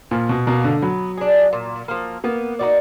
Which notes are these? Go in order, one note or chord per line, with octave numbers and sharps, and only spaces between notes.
A#2 F3
B2
B2 A#3 D#4
D3
F#3 B3
D4 G#4
A#2
F3 A#3
A#3 B3
D#4 F#4 D5